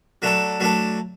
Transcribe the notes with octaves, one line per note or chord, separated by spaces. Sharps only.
F#3 A3 D4 A4
F#3 A3 D4 A4